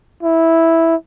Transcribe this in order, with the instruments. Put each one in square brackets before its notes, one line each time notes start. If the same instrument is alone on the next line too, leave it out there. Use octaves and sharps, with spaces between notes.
[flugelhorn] E4